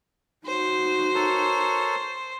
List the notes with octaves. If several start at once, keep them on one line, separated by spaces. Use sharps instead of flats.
D#4 F#4 C5
A4 A#4 C#5